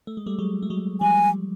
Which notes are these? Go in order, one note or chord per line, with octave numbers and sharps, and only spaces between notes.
A3
G#3
G3 A3
F#3 G#3
A3
F#3 G#3
F3 G3 G#5